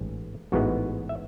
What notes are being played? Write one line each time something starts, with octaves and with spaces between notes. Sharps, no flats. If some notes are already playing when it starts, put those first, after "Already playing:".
Already playing: A1 G#2
A1 G#2 E3 G#3 B3 F#4
E5